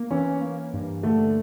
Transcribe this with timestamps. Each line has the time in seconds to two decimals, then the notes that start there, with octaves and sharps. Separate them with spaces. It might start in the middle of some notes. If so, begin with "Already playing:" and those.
Already playing: A#3
0.11 E3 C#4
0.41 A#3
0.73 G2
1.03 D3 A3